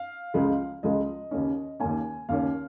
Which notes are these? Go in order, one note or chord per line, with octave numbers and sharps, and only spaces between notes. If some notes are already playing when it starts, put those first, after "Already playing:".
Already playing: F5
C#2 C#3 F3 G#3
C#2 C#3 F3 G#3 D#5
D#2 C#3 A#3 C#4
D#2 C#3 A#3 C#4 G#5
D#2 C#3 A#3 C#4 F5